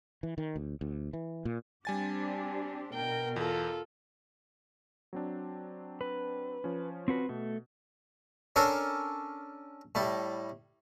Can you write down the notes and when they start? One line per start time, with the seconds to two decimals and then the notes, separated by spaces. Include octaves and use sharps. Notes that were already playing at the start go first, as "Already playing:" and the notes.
0.23 E3
0.38 D#3
0.56 D2
0.81 D2
1.13 E3
1.45 A#2
1.85 G3 C4 D4 G4 G#5 A6
2.94 B2 A#4 G5
3.36 E2 F4 A4
5.13 F#3 C4 D4
6.01 B4
6.64 F3 C#4
7.08 C4 F#4 B4
7.29 B2 A3
8.56 C#4 D4 A4 A#4
9.95 A2 G3